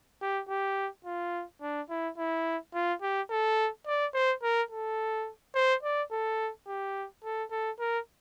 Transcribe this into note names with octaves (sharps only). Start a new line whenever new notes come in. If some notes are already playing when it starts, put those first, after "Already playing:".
G4
G4
F4
D4
E4
E4
F4
G4
A4
D5
C5
A#4
A4
C5
D5
A4
G4
A4
A4
A#4